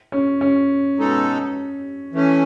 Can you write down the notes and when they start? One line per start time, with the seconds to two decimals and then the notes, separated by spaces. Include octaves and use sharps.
0.12 C#4
0.41 C#4
0.98 B2 G#3 D#4 A4
2.13 E3 A3 C#4